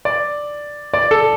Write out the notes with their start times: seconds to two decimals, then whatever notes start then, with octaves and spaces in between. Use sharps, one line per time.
0.05 D5
0.93 D5
1.11 A4